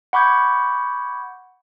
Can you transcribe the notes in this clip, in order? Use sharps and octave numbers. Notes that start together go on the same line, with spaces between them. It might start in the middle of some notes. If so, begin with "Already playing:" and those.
F#5 B5 C#6 D6 G6 G#6